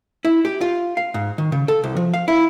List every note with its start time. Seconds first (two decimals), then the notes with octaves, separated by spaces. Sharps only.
0.25 E4
0.45 G4
0.61 F4
0.97 F5
1.14 G#2
1.38 D#3
1.52 C#3
1.68 A4
1.84 C2
1.97 F3
2.14 F5
2.28 E4